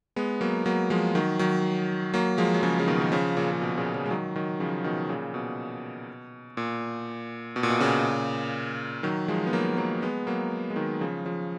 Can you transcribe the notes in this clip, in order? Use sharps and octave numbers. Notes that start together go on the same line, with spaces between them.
G#3 B3
F#3 A#3
F#3 A#3
F3 G#3
D#3 F#3
D#3 F#3
F#3 A#3
F3 G#3
F#3
C#3 F3
C#3
B2 D#3
D#3
C#3 F3
A#2 C#3
C#3
B2
A#2 C#3
C#3 F3
G#3
D#3 F#3
D#3 F#3
C#3 F3
B2 D#3
A#2 C#3
B2
A#2
B2
A#2
B2
A#2 C#3
D#3 F#3
F3 G#3
B3
F#3 A#3
F#3 A#3
G#3 B3
F#3 A#3
G#3
D#3 F#3
C#3 F3
C#3 F3